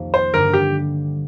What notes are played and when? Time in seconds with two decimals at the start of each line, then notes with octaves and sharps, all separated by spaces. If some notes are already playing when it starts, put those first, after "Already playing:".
Already playing: C2 F2 D#3 A#3
0.14 C5
0.33 G2 D3 G3 A#4
0.53 G4